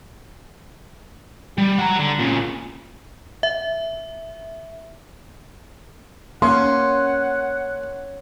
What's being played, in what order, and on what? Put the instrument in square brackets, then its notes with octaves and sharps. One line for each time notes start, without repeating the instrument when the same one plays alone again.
[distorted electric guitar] G3
F#4 A#5
D3
A#2 C#3
[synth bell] E5
[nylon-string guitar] A#3 [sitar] C#4 [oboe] F#5 [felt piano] C6